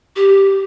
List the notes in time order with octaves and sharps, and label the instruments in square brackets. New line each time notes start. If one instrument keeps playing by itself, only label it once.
[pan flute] G4